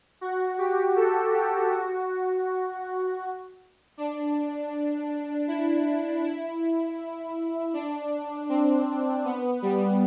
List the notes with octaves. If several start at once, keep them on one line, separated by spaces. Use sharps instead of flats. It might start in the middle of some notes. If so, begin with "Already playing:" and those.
F#4
G4
A4
G4
F#4
D4
E4
E4
D4
C4
B3
G3